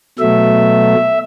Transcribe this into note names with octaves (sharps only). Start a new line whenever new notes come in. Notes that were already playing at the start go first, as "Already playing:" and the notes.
B2 F#3 A3 E5